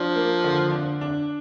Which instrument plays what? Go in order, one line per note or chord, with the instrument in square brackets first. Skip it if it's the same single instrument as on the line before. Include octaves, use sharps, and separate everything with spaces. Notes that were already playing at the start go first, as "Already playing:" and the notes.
Already playing: [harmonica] F3 [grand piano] D4
[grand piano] A#3
D3
D4
D4